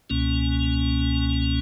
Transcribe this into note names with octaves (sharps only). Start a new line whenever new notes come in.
C#2 B2 A#3 C#4